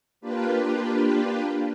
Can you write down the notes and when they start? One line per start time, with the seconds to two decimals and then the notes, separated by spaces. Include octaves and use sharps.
0.21 A#3 D4 F4 G4 B4